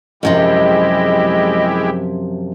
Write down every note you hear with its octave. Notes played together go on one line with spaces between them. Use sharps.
F#2 C3 F3 G#3 E4 G4 D#5